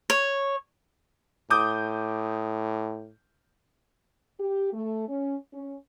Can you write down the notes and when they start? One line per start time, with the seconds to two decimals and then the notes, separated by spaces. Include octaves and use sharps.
0.10 C#5
1.50 A2 D6 D#6 G6
4.39 G4
4.73 A3
5.08 C#4
5.52 C#4